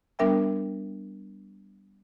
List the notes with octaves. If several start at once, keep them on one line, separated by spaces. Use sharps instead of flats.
G3 B3 D4 A#4 E5 G5